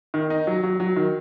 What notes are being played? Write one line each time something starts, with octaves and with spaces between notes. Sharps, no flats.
D#3
D#4
F#3
F#3
F#3
D#3